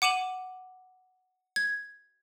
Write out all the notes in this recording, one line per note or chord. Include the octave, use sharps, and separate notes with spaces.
F#5 D6 D#7 E7 F#7
G#6